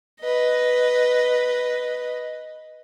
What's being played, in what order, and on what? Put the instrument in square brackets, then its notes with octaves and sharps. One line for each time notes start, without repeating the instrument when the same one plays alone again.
[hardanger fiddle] B4 D#5